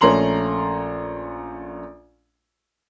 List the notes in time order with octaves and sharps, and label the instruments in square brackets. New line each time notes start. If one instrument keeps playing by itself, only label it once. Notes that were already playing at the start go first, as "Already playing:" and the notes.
[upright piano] A#1 A3 C#4 A#5 C6 F#7